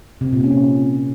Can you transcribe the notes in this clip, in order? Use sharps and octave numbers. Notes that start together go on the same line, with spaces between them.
C3
A#2
C#4